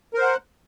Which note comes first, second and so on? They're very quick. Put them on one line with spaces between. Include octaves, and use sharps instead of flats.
A#4 C5 F#5